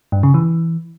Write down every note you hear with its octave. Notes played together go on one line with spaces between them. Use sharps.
G2
C#3
E3